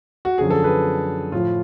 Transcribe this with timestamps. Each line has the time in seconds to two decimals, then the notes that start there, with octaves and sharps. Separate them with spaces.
0.25 F#4
0.38 F#2 D3 F3 G#4
0.50 A4
0.64 G#4 B4
1.32 A2 F3 F4